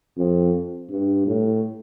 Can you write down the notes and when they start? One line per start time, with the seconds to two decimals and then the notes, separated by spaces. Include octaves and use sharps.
0.17 F2
0.90 G2
1.27 A2